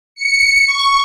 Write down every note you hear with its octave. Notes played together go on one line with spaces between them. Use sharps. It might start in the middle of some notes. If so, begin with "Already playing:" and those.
C#7
C#6